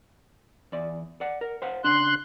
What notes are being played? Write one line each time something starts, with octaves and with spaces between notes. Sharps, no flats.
E2 D5
D5 F#5
A#4
C5 F5 F#5
C#3 D4 C6 F#6